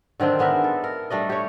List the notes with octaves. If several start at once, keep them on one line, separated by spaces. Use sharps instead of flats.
D3 D#3 C4 D4
G#3 B3 A#4 E5
A4
A#4
G3 A3 D4 D#5
G4 C#5